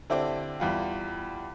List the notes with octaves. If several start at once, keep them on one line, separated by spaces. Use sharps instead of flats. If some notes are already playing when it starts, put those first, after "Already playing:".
D3 C4 E4 G4 D5
E2 G3 F4